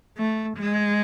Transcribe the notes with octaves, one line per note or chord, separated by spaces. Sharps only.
A3
G#3